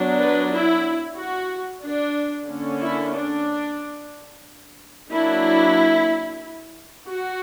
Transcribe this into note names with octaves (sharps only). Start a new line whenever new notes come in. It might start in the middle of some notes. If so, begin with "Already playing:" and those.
Already playing: F#3 B3 D4
B4
E4
F#4
D4
D3 A#3 C#4
E4
D4
F#3 A#3 D4 E4
F#4